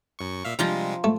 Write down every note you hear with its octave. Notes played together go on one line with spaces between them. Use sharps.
F#2 C#6
A#2 E5 F5
C3 F3 G3 G#3 F4 A#5
A3